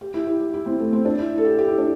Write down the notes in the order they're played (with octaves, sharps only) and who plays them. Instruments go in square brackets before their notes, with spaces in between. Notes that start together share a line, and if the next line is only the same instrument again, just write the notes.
[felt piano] G4
E4
G4
G4
E4
C4
A3
C4
D4
E4
A4
G4
G4
E4
D4